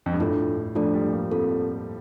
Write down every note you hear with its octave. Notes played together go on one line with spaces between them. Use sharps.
F2
G2
A2 D4 F4 A4
F3 A3 D4 F4 A4 D5
G3
A#3
C4 F4 A4